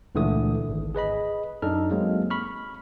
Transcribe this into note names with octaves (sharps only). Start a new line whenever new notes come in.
C#2 A#2 D3 E3 A3 D#6
G#1
G#4 B4 D#5 B5
F#2 D4 D#4 A4 F6
F#3 G#3 A#3 C4
B5 C#6 F6